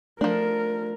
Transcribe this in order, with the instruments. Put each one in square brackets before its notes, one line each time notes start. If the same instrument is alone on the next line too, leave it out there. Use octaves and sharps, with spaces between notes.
[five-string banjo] F3 D4 [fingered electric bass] A3 [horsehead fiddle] A#4